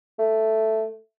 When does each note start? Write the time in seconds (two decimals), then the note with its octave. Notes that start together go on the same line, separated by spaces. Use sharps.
0.19 A3